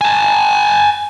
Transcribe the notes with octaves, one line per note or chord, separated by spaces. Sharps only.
G#5 A5